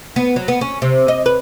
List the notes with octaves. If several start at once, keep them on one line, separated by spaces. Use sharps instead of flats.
B3
F#3
B3
C#4
C3
D#5
B4